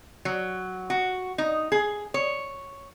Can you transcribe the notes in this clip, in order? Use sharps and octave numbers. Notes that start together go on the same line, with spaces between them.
F#3
F#4
D#4
G#4
C#5